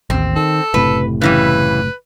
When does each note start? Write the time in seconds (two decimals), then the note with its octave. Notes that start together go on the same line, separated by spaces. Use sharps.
0.10 A1 D#2 C4
0.36 D#3 A4
0.74 F#1 A2 C3 B4
1.21 C#3 E3 G3 B4